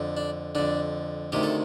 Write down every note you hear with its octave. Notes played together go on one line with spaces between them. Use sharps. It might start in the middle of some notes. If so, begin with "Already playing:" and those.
Already playing: F2 D3
D4
F2 D3 D4
D2 C3 D#3 G4
A4